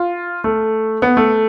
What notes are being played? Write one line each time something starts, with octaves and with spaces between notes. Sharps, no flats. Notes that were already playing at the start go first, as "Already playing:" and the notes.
Already playing: F4
A3
B3
A3